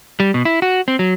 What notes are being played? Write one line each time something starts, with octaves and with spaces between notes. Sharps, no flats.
G3
B2
E4
F#4
C4
F#3